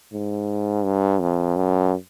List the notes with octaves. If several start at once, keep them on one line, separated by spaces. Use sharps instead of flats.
G#2
G2
F2
F#2